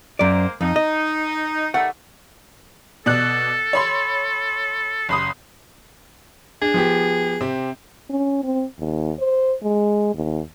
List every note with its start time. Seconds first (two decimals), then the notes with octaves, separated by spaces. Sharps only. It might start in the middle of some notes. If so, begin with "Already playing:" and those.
0.19 F#2 G#3 A#3 C5 D5
0.61 F2 D#4
0.76 D#5
1.74 D#3 G3 A3 F#5
3.06 B2 A4 D5 F#6
3.73 C#5 B5 C6
5.09 F#1 B5 C6 D#6
6.62 D4 G#4
6.74 F3 B3 G4
7.41 C3 C4 G4
8.10 C#4
8.43 C4
8.79 D#2
9.19 C5
9.63 G#3
10.15 D#2